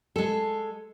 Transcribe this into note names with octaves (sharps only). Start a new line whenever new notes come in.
G#3 A4